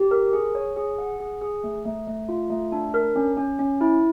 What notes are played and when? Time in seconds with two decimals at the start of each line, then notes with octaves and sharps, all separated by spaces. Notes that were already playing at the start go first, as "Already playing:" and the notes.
Already playing: G4
0.11 A#4
0.33 G#4
0.55 C#5
0.76 G#4
0.98 F#5
1.20 G#4
1.42 G#4
1.64 A3
1.85 A3
2.07 A3
2.29 F4
2.50 A3
2.72 D4
2.94 A#4
3.16 C#4
3.37 C#4
3.59 C#4
3.81 E4